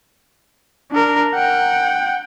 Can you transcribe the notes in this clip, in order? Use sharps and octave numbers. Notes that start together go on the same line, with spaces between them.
D4 A#4
F#5 G5